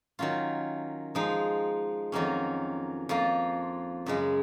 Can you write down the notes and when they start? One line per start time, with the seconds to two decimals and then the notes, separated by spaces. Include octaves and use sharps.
0.19 D#3 F#3 C#4 F4
1.15 F3 G#3 D#4
2.12 F2 D#3 F#3 A#3 C#4
3.09 F2 F3 A#3 F4
4.06 F#2 C#3 G#3